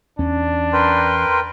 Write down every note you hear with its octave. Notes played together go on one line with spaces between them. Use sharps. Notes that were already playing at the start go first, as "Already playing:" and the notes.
E2 C#4 D4
A#4 B4 G5 C6